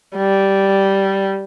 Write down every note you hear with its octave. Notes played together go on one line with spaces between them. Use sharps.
G3